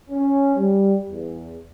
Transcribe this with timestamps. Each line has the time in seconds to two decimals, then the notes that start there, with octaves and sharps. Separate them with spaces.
0.10 C#4
0.55 G3
1.08 E2